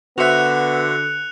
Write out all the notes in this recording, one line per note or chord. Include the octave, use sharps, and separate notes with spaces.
D3 B3 F#4 C5 E5 F#6 C#7 F7